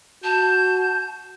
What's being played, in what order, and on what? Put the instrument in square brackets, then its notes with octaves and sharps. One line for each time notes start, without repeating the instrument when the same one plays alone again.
[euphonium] F#4 [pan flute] A5 [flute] G6